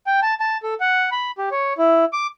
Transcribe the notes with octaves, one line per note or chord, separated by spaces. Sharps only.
G5
A5
A5
A4
F#5
B5
G4
C#5
E4
D6